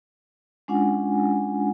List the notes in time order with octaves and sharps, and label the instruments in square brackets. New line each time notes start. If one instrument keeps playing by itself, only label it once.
[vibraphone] G#3 C#4 D4 F4 F#5 G#5